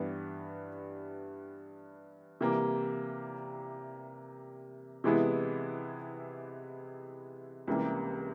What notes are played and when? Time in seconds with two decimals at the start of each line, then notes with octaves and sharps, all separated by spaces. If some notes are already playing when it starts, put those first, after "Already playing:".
Already playing: G2 E3 G3 B3
2.41 C3 E3 G3 A#3
5.04 C3 E3 G#3 B3 E4
7.67 C#2 C3 E3 G3 A#3